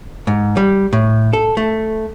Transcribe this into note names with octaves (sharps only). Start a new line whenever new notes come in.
G#2
G3
A2
A4
A3